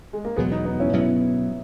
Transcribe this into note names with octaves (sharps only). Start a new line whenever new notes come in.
G#3
A#3
E2 B2 F#3 G#3 B3
B3 D#4
B3 D#4
C#4 E4
B2 F#3 B3 C#4 E4